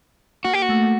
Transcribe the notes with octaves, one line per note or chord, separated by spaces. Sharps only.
A#3 F#4
G4
F#4
A3